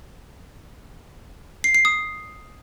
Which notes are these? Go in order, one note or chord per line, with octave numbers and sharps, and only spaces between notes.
C7
C7
D#6